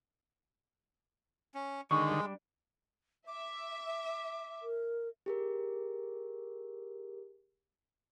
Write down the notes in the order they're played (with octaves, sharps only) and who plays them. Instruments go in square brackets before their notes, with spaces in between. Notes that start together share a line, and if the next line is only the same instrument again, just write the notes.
[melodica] C#4
[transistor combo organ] D3 D#3 [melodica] G#3 [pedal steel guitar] C#6
[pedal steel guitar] G3 D4
[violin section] E5 [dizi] D6
[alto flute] A#4
[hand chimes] G4 G#4 A#4